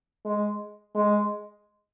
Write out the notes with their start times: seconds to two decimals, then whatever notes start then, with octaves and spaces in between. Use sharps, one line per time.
0.25 G#3
0.95 G#3